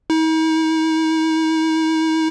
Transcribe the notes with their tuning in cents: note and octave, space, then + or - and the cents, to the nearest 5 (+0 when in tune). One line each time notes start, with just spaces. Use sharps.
D#4 +45